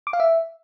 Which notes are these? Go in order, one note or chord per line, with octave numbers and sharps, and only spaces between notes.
D6
F5
E5